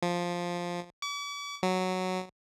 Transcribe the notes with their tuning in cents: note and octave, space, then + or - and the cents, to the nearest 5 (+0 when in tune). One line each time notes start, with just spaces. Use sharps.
F3 +5
D6 -45
F#3 +0